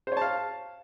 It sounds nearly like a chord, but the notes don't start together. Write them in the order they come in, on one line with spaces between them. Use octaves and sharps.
C5 C#5 A5 F5